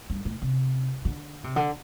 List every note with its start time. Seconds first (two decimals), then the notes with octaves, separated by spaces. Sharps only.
0.10 G2
0.25 A2
0.42 C3
1.05 D3
1.44 C3
1.56 D3